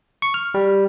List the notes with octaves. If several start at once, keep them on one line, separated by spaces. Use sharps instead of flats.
C#6
F6
G3